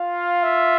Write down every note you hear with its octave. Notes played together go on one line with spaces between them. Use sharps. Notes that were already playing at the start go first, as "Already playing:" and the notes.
Already playing: F4 F5
E5